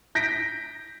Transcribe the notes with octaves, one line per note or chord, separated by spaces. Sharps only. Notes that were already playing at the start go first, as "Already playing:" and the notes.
G6 A#6 B6 D7